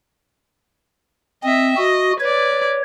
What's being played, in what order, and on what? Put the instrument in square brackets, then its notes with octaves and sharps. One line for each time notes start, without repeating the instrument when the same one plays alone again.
[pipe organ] C4 [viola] D#5 E5
[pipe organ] F#4 [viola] D#5
[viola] B4 D5 [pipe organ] C#5